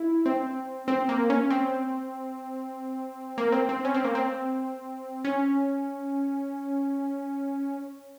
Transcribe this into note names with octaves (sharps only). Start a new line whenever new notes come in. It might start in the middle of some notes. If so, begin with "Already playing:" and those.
Already playing: E4
C4
C4
A#3
C#4
C4
A#3
C4
C4
C#4
C4
A#3
C4
C#4